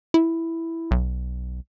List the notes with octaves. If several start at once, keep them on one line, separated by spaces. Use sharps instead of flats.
E4
B1